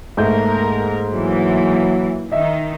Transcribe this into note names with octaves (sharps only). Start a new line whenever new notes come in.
G#2 A3 A#3 A#4 G6
E3 F#3 A#3
D#3 D#4 D#5 E5